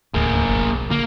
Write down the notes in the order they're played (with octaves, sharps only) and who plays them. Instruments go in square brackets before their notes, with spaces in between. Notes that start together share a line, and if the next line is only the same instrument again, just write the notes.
[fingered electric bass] D#1 D2 A2 [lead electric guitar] A#3 G#4
[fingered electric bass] G1
B1
[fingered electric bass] D3 [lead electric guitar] A#3